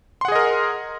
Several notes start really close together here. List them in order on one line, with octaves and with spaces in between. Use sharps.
C6 F#5 G#4 D#5 A#4